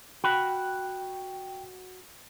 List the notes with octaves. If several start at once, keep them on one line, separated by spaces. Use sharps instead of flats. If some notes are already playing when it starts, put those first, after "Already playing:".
F#4 G5 B5